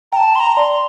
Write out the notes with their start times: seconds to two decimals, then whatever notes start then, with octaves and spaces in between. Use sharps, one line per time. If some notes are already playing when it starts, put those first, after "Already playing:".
0.12 G5 A5 A#5
0.35 C6
0.40 A#5
0.57 D5 C6